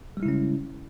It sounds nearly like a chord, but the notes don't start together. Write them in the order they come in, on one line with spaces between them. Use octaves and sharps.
G3 G#3 E4 C#3 C#4